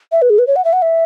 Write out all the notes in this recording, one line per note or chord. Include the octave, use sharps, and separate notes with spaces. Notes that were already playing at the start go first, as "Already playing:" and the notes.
E5
B4
G#4
B4
C#5
F#5
E5
F#5
E5